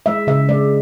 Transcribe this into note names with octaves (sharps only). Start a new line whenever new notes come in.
G#3 E5
C#3 E5
G#3 D5